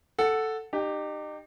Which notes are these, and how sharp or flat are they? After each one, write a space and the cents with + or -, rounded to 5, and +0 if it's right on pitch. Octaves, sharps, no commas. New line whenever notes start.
A4 +0 F#5 +0
D#4 -35 G4 +0